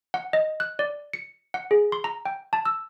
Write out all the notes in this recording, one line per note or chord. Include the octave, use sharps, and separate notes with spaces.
F#5
D#5
F#6
D5
C#7
F#5
G#4
C6
A#5
G5
A5
E6